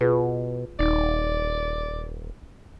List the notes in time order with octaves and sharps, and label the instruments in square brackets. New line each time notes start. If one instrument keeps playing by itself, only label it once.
[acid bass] B2 [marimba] F4 G#4 B4
[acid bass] D#1 [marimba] D#4 [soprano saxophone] D5